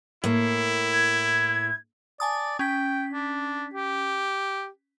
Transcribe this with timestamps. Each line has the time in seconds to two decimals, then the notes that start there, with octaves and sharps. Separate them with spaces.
0.24 A2 A#3 E4
0.93 G#6
2.20 D5 G#5 A5 D#6
2.59 C#4 G5 B6
3.13 D4
3.74 G4